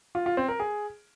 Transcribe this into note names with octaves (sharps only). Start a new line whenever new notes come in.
F4
F4
C4
A#4
G#4